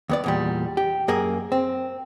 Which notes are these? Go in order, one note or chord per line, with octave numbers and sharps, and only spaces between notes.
D#2 B3 D5
E2 A#2 G3
G4
F#2 A#3 G#4
C4